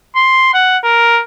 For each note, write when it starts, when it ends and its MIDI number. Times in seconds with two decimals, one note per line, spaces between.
0.16 0.51 84
0.54 0.78 78
0.84 1.22 70